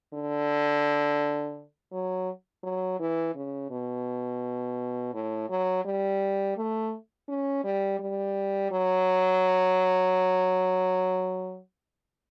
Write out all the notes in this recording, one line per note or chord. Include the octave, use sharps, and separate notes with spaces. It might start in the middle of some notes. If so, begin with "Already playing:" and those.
D3
F#3
F#3
E3
C#3
B2
A2
F#3
G3
A3
C#4
G3
G3
F#3